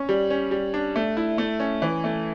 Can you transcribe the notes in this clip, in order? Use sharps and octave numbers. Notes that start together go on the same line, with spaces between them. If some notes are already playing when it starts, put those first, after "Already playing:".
Already playing: C#4
G3
C#4
G3
D4
A3
E4
A3
C#4
E3
A3